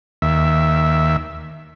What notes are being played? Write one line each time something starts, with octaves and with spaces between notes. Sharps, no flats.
D#2 E5